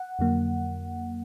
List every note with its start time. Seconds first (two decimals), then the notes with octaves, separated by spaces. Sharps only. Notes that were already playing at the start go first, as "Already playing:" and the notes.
Already playing: F#5
0.19 F2 D3 F#3 A#3